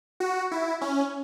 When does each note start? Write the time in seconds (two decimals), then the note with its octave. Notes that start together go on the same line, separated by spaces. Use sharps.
0.20 F#4
0.52 E4
0.81 C#4